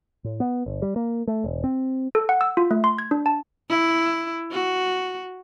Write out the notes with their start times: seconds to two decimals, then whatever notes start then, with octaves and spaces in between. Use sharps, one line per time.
0.24 A2
0.40 B3
0.66 G1
0.82 G3
0.96 A#3
1.27 A3
1.44 E1
1.64 C4
2.15 A4
2.29 F#5
2.41 E6
2.57 F4
2.71 A3
2.84 C6
2.98 G#6
3.11 D4
3.26 A5
3.69 E4
4.52 F#4